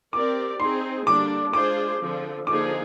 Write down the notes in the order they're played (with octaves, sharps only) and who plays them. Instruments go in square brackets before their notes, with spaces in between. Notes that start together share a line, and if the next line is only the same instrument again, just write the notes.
[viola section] C4 G4 A#4 D5 [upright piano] D6
[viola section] C4 D#4 G#4 [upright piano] C6
[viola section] D3 G3 A#3 D4 [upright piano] D6
[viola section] G#3 D4 F4 G#4 C5 [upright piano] D6
[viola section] D3 F3 C4
[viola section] D3 F3 A#3 D#4 G#4 [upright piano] D6